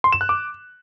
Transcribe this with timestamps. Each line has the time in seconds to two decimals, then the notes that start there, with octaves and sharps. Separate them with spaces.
0.04 C6
0.12 E7
0.21 F#6
0.29 D6